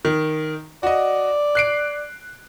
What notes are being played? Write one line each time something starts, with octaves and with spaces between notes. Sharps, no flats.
D#3
F#4 D5 D#5
F#6 C7 D7